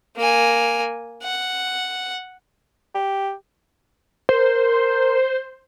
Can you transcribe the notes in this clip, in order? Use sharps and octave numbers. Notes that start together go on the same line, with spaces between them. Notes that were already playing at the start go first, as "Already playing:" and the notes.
A#3 G#5
F#5
G4
A#4 C5